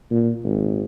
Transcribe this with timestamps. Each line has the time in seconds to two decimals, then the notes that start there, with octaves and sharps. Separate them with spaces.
0.11 A#2
0.43 G#1